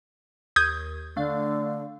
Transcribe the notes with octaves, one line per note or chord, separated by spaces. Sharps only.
D#2 D#6 G6 G#6
D3 A3 D4 F5